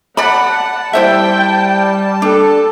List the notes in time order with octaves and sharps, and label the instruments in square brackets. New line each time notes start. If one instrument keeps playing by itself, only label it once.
[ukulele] D5 B5 [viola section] F#5 [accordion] A5
[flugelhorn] G3 [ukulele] E4 C5 E5 [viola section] G5
[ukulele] D4 [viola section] A4